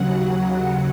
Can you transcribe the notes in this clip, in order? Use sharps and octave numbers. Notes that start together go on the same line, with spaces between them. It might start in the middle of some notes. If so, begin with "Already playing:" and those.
Already playing: D#2 C#3 F#3 F#5